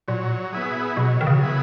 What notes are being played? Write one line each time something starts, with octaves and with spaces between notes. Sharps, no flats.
A#2 F#3
B3 E4 G#4
B2 F#3
D#3
C#3
B3 E4 G#4